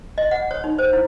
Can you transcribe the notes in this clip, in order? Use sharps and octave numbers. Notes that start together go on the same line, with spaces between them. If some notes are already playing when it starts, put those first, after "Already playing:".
D#5
F#5
C#5
D#4
C5
E4